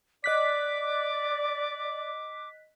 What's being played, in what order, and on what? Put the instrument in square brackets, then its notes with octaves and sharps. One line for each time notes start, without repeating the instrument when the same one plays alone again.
[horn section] D5 [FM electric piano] D#5 F#6 B6 [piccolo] D6